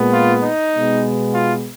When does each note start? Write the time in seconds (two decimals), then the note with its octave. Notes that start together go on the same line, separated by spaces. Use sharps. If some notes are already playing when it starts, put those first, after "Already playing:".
Already playing: A#2 G#3 B3
0.14 F4
0.44 D#4
0.74 B2 G#3 B3
1.35 F4